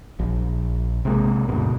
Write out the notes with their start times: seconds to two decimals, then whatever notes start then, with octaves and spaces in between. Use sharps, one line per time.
0.19 A#1
1.05 C3 G#3 A#3
1.49 D2 G2 B2